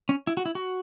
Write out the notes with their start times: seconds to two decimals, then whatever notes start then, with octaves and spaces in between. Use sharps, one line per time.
0.09 C#4
0.27 E4
0.37 F#4
0.46 E4
0.55 F#4